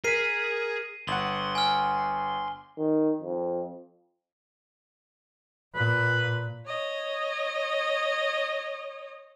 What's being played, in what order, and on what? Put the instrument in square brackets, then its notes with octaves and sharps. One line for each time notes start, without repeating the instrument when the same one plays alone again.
[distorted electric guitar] G#4 [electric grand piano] A#4 B6 [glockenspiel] C7 D#7
[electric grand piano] G1 F#5 [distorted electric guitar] C6 [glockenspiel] F#7
[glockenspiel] G#5 F6
[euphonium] D#3
F2
[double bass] A#2 [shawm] B4
[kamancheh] C#5 D#5